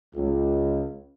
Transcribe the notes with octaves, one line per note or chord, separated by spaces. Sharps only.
C#2